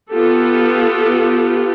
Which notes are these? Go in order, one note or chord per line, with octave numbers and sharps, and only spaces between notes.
B3 F4 G4 A4